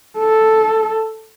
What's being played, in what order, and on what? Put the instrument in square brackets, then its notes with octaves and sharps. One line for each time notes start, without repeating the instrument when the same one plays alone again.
[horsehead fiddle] A4